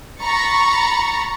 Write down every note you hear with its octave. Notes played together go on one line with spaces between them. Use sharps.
A#5 B5 C#6 A6 C#7